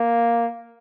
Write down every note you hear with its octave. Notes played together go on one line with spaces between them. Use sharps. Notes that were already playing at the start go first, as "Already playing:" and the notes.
Already playing: A#3